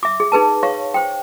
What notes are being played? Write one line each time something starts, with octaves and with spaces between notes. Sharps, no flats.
E5 D6
G#4
D#4 G#4 B4 A5
C#5 F5 C#6
C5 G5